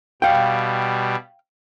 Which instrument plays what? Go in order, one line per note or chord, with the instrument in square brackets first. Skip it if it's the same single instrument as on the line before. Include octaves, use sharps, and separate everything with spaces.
[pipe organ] B2 G3 [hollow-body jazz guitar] F5 G5